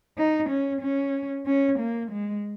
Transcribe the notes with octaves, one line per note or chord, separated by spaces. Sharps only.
D#4
C#4
C#4
C#4
A#3
G#3